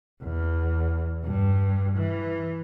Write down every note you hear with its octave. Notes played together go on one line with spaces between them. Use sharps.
E2
G2
E3